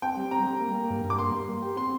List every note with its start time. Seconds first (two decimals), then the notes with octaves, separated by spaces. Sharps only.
0.02 C4 G5
0.17 G3
0.31 C4 A#5
0.46 G3
0.60 A#3
0.75 A#3
0.90 G2
1.04 G2
1.10 D6
1.19 A#3 C6
1.34 G3
1.48 A#3
1.62 G4
1.76 C4 C6